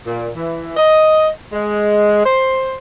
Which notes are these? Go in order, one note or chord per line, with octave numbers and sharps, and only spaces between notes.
A#2
E3
D#5
G#3
C5